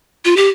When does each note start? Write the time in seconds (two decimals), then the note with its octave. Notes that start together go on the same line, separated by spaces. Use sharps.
0.25 F4
0.37 G4